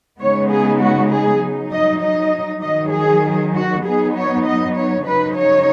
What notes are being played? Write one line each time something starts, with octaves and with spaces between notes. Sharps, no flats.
C#3 G#3 B3 D#4 C#5
G#4
F#4
G#4
F#3 D#4
D#5
D#5
D#3 F#3 D#4 D#5
G#4
F#4
F#3 B3 D#4 G#4
C#5
D#5
C#5
C#3 F#3 D#4 B4
C#5